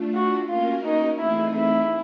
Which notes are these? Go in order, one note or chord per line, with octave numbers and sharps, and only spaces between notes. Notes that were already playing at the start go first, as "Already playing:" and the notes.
Already playing: A3 D4 F4
F#4
A#3 C#4 F4 F#4 A#4
D#4
E3 A3 C4 D#4 E4 G#4
E4